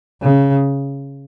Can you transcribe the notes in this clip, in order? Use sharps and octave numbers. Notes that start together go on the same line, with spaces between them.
C#3